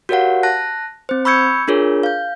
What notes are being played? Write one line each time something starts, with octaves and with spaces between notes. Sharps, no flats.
F#4 G4 A#4 C#5 F5 F#5
A5 F#6 A#6
C4 C5
B5 C#6 E6 G6 G#6 C#7
D4 F4 G#4 A#4 C#5
F5 G6